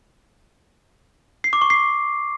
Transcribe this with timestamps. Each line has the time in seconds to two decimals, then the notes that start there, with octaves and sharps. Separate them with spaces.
1.44 C7
1.53 D6
1.62 C#6
1.70 C7